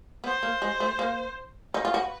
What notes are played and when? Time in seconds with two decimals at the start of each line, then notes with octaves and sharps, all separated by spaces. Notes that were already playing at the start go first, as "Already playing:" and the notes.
0.24 B3 C5
0.43 A#3
0.62 G#3
0.80 A3
0.99 A#3
1.74 D#4 B4
1.85 F4
1.94 F#4